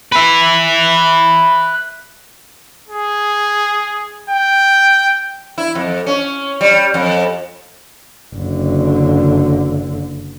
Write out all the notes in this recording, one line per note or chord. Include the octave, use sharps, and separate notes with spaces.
B4 E5
G#4
G5
E4
F2
C#4
G3
F2
F#1 D3